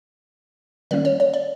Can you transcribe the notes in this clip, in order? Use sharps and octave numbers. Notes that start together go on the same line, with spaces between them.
D#3 G3 A#3 C#4 D5
C#5
C#5
D5